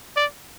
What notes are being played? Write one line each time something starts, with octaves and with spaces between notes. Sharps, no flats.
D5